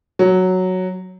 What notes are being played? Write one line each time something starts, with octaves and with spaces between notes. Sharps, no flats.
F#3